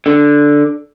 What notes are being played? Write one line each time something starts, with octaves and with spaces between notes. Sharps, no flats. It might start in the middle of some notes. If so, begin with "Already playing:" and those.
D3